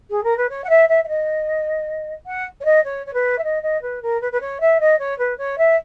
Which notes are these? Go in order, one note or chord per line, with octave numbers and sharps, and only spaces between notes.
G#4
A#4
B4
C#5
F#5
E5
E5
E5
D#5
F#5
C#5
D#5
C#5
C#5
B4
E5
D#5
D#5
B4
A#4
B4
B4
C#5
E5
D#5
C#5
B4
C#5
E5